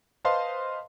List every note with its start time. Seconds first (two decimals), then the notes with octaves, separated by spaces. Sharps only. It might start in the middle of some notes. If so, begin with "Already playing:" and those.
0.25 B4 C5 D#5 F5 A5 C6